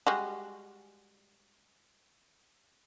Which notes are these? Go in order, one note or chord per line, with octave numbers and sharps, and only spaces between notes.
G3 G#3 F#4